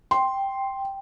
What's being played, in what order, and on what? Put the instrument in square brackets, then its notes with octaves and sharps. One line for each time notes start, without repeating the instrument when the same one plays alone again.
[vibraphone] G5 [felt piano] C6